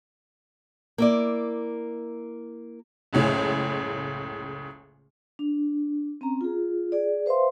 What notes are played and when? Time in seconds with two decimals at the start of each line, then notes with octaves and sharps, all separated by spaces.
0.98 A#3 E4 D5
3.13 F#1 C#2 A2 C#3
5.39 D4
6.21 C4 C#4 A#5
6.41 F4 G#4
6.92 G#4 D5
7.26 B4 C5 E5 F5 C6